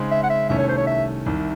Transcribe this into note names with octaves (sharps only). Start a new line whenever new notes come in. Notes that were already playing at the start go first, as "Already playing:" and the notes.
Already playing: C#3 G#3 C4 D#4
E5
F#5
E5
C2 C3 D#3 A3 C#4 E5
C#5
C5
C#5
E5
C2 C3 D#3